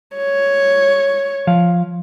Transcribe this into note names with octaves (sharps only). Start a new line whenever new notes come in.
C#5
F3 F5